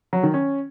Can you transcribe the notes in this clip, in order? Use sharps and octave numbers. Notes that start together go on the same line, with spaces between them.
F#3
D#3
C#4